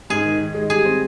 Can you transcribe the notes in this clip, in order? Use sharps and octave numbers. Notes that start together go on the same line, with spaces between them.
G#2 G#4
D#3
D#3
G#3
G3 G#4
C4